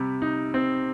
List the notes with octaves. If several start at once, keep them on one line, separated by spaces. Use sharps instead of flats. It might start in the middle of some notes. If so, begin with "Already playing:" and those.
Already playing: C3 G3
D#4
C4